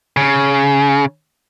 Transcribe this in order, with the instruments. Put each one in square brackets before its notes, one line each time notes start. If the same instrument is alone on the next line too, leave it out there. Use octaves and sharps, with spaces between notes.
[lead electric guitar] C#3